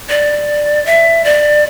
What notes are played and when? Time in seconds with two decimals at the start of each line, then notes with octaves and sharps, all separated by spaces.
0.09 D5
0.86 E5
1.24 D5